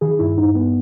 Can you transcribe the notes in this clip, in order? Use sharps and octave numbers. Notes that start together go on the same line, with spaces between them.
D#3 G#4
G2 E4
G2 D#4
G2 B3